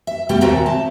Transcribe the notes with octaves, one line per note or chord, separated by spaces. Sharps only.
E5
B2 G3 A3 G4
D#2 A#2 C4 F#4 E5 A#5
A5